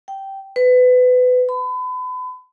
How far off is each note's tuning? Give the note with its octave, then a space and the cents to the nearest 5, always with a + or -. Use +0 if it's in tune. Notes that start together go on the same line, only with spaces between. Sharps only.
G5 -10
B4 +25
B5 +35